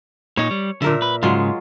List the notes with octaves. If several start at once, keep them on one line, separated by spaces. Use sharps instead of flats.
A#2 D#4 C#5
G3
A#2 D3 A#4 E5
B4
G#2 C#3 F#3 G#3 F4